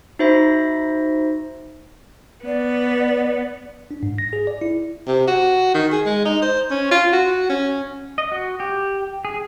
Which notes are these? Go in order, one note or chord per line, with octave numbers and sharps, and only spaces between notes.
D#4 F#4 C5 E5 B5 A#6
B3 D5
D4
G#2
A#6
G#4
D5
E4
C3
F#4
D#3
G#4
G#3
D#4
C5
C#4
F4
F#4
C#4
D#5
F#4
G4
G#4